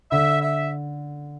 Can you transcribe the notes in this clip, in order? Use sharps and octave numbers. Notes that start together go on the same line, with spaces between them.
D3 E5
E5